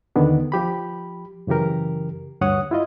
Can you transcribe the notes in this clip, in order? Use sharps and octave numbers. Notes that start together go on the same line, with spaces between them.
D#2 D3 D#3 B3 D4
F3 G4 B5
F#2 C#3 E3 G4 A#4
D2 G2 C#5 F#5 D#6
E4 F4 D#5